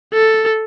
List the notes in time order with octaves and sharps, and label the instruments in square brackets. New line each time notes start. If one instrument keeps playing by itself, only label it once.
[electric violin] A4